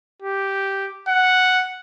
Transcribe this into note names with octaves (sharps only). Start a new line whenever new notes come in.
G4
F#5